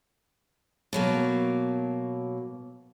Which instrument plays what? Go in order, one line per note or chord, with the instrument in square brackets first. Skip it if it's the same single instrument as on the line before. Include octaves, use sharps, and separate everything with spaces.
[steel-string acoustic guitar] B2 F#3 A#3